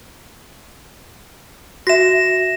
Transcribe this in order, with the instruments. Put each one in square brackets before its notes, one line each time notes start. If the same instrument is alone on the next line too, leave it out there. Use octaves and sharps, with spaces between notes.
[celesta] F#4 E5 [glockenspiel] A#6 E7